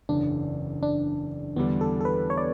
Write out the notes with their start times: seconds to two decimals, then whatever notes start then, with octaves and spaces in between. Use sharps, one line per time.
0.09 F#1 E2 C#3 D4
0.83 D4
1.56 E2 D3 G3 B3 D4
1.81 A4
2.01 A4
2.05 B4
2.30 C#5
2.38 D5